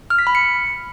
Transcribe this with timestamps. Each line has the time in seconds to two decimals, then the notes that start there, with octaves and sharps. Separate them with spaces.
0.10 F6
0.19 B6
0.27 B5
0.35 C#7